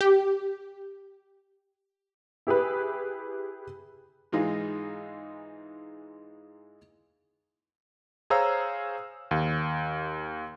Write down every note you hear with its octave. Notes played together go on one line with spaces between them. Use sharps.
G4
E4 G4 G#4 B4
G#2 E3 G#3 D#4 F4
G#4 C5 C#5 F5 A#5 E6
D#2